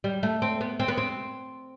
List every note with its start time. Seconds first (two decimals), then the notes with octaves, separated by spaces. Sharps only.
0.04 G3
0.23 A3
0.42 C4
0.61 B3
0.80 C4
0.88 B3
0.97 C4